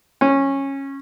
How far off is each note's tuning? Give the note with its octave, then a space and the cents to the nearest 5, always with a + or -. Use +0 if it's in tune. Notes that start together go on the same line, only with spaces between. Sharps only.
C#4 -15